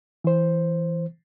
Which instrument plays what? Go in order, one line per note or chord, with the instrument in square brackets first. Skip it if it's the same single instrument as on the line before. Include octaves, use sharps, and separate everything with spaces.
[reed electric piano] E3 C5